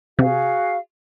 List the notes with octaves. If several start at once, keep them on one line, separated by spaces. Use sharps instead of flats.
C3 F#4 G#4 F5